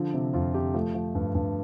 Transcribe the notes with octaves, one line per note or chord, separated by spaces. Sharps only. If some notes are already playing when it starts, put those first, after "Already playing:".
Already playing: D3 F3
C3
F2 F4
C3 G4
F3 A3
F3
G2
G2